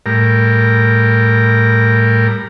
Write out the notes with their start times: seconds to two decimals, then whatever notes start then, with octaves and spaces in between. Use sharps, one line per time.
0.06 A2 G3 A#4